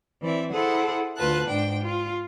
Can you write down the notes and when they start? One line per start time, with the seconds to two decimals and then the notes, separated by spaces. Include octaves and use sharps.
0.21 E3 C4 D5 E5
0.52 E4 G#4 A4 C5 F#5
1.16 D2 F4 B4 A5 F#6
1.47 G#2 D4 G5
1.83 F4